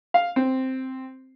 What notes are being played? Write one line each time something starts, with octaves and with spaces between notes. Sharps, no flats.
F5
C4